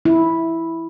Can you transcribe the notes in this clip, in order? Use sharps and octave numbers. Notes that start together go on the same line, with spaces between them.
E4